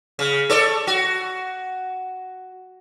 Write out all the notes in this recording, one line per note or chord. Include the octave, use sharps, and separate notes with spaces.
C#3
A4 C#5 D5
F#4